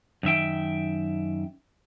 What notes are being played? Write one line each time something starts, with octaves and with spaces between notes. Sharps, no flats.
F#2 D#3 E5 G5